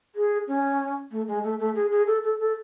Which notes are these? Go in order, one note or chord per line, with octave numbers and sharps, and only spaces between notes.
G#4
C#4
A3
G#3
A3
A3
G#4
G#4
A4
A4
A4